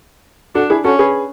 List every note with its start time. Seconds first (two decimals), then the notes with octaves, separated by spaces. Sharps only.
0.55 D4 F#4 A4
0.70 E4 G#4
0.84 C#4 F#4 A4
0.99 G#4 B4